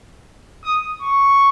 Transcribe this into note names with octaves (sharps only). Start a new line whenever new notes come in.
D#6
C#6